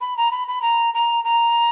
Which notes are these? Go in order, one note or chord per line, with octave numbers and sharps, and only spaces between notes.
B5
A#5
B5
B5
A#5
A#5
A#5